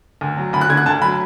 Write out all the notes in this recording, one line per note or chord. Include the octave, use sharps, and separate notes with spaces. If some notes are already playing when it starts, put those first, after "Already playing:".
D2
F#3
D2 B5
F#6
D3 G#6
F#6
D2 A5
F#3 B5